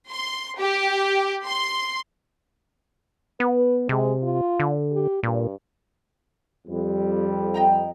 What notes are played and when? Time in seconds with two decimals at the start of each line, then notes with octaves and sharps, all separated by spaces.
0.10 C6
0.58 G4
1.46 C6
3.40 B3 B4
3.89 C3 G#3
4.23 F4
4.60 D3
4.92 G4
5.23 G2 A#2
6.67 F2 G3
7.54 D#5 G5 A#5